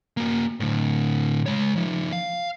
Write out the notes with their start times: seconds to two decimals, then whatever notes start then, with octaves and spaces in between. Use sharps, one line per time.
0.17 A#3 F#4
0.60 A2 D3
1.46 G#3 C#5
1.76 F3 D#4
2.13 F5